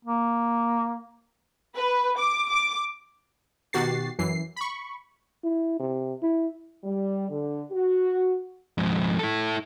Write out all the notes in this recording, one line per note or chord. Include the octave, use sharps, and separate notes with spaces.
A#3
B4
D6
D6
B2 D#3 F#4 G4 A6 C7
F#2 E3 C7
B5 C#6
E4
C3
E4
G3
D3
F#4
F2 G#2
E4 A4